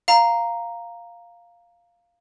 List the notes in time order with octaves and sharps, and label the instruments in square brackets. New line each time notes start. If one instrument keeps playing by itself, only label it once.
[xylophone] F5 A#5